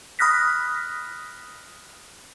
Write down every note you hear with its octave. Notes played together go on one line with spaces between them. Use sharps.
B5 D#6 F6 F#6 A#6 B6